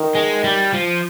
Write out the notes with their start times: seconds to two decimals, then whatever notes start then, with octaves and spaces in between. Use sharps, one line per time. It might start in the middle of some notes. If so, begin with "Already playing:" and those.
Already playing: D#3
0.15 G#3
0.44 G3
0.74 F3